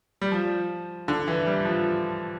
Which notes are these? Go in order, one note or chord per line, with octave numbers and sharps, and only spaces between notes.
G3
F3
D3
E3
G3
F3